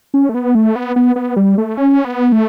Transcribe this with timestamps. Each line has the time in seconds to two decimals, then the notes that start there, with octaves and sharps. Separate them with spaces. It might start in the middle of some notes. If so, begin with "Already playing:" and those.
0.14 C#4
0.29 A3
0.34 B3
0.55 A3
0.76 B3
0.96 B3
1.16 B3
1.36 G3
1.58 A3
1.77 C#4
2.05 B3
2.32 A3